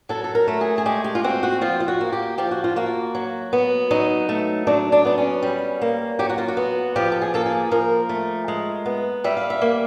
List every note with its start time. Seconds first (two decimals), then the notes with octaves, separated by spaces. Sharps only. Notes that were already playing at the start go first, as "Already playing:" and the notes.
0.09 F#3 A4
0.24 A4
0.35 A#4
0.48 A3
0.61 G#4
0.78 G#4
0.86 G#3 G4
1.04 G4
1.15 F4
1.24 C4 F#4
1.43 F#4
1.61 F3 F4
1.80 F4
1.88 F#4
2.01 A#3
2.13 G4
2.38 F3 G4
2.51 F#4
2.64 F4
2.76 A#3 F#4
3.15 F#3
3.53 B3
3.91 F#3 D#4
4.29 A3
4.67 F#3 D4
4.92 D4
5.05 B3 D4
5.18 C#4
5.42 G3
5.82 A#3
6.19 F#3 G4
6.29 F#4
6.38 F4
6.48 F#4
6.57 B3
6.96 F3 G4
7.12 A4
7.21 G#4
7.34 A#3 A4
7.46 G#4
7.71 F3 A#4
8.09 A3
8.48 G#3
8.86 B3
9.24 G3 E5
9.37 F5
9.50 E5
9.62 A#3